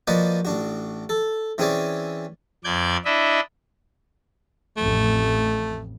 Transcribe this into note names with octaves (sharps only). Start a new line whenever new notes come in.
F3 A#3 F#4 B4 D5 D#5
A1 D4 F#4
A4
E3 C4 C#4 G#4 C#5 D5
F2 D5 G6 G#6
D4 E4 D#5 E5
A1 F2 A3